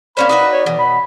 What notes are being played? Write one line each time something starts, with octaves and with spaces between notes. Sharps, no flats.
A#3 C#4 C5 D5 B5
D#4 F#4 B4
C#5
B2 E3
B5